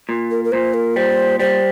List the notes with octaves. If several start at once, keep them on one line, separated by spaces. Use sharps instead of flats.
A#2
A#4
A#4
A#2 C5
A#4
G3 C5
G3 C5